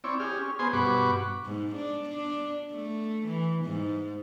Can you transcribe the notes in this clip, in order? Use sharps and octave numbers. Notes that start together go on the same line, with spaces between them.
C4 E4 C#5 D5
G4 G#4 F6
C#4
B3 G#4 C5 G#5 C6
G2 B2 F#5 B5 C#6 D6
G#2
D4
D4
A3
E3
G#2